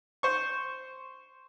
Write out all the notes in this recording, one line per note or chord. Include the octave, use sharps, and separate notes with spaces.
C5 C#6